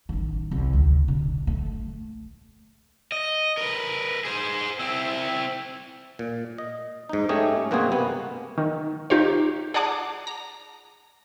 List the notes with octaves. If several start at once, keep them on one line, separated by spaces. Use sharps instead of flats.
A1 D#3
C2
D2 C3
B2 D3
A3
D#5
A#4 B4
G#4 C5
C4 E4
A#2
D#5
G#2 D#4
A3 C#4 G4 G#4 D#5
G2 B2 A#3 C4 F#4 G#4
C3 A#3 B3
D#3
D#4 F4 G4 C5 C#5
G#4 D5 F#5 A5 D6
A#5